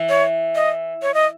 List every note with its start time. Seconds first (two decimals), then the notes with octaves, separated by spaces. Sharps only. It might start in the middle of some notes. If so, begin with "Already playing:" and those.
Already playing: E3
0.09 C#5
0.55 D#5
1.02 C#5
1.14 D#5